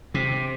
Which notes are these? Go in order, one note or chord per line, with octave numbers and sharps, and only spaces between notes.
C3